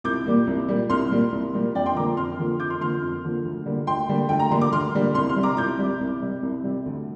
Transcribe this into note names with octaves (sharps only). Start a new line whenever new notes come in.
C2 D6 G6
A#2 G3 A#3
C2
A#2 G3 A#3
C2 C6 F6
A#2 G3 A#3
C2
A#2 G3 A#3
F2 D5 G5
G5 C6
D3 F3 A#3 A#5 D6
F2 C6 F6
D3 F3 A#3
F2 D6 G6
C6 F6
D3 F3 A#3 C6 F6
F2
D3 F3 A#3
D2
D3 G3 A#3
D2 G5 C6
D3 G3 A#3
D2 G5
A#5
D3 G3 A#3 C6
D6
D2 C6 F6
D3 G3 A#3
C2 C6 F6
C6 F6
C3 G3
A#5 D6
C2 D6 G6
C3 G3
C2
C3 G3
C2
C3 G3
D2